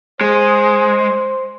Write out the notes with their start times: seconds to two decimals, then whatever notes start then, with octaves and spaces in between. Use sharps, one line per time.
0.21 G#3 C5